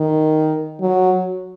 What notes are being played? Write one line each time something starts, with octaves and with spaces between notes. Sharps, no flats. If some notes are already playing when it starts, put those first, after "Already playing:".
Already playing: D#3
F#3